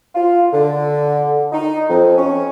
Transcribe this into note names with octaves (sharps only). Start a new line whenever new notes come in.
F4
D3
D#4
F2
C#4